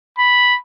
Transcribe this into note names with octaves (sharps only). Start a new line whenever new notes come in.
B5